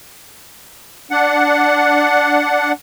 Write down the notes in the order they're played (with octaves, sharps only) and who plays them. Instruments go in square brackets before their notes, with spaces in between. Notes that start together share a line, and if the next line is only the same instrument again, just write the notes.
[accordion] D4 F#5